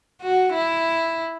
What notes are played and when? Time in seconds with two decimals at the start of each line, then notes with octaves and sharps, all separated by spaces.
0.22 F#4
0.54 E4